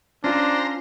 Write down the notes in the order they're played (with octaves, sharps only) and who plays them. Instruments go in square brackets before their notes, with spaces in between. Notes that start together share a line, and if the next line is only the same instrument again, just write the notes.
[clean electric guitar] C#4 F4 [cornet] D4 [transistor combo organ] C5 A#5